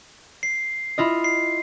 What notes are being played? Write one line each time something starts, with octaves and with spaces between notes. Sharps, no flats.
C7
E4 F4 D#5
C7